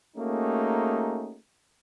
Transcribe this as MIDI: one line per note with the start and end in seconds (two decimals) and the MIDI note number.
0.17 1.36 57
0.17 1.36 58
0.17 1.36 61
0.17 1.36 63
0.17 1.36 66
0.17 1.36 68